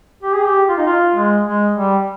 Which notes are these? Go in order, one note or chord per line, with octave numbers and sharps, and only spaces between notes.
G4
G#4
G4
F4
D#4
F4
G#3
G#3
G3